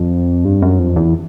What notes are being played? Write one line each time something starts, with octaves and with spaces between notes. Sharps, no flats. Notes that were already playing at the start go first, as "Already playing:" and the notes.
Already playing: F2
G2
F#2
F2
E2